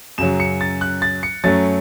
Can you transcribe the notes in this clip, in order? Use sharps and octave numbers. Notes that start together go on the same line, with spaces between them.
F#2 C#3 F#3 E7
C#7
A6
F#6
A6
C#7
F#2 F#3 A3 C#4 A6